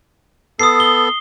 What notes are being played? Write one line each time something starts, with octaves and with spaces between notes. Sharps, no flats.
B3 A4 D#6 C7
G7